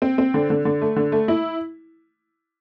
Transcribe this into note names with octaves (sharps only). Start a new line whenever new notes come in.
C4
C4
D3
D3
D3
A3
D3
A3
E4